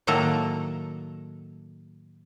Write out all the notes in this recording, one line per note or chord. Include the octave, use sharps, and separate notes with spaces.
A2 D#3 F#3 A#3 A4 A#5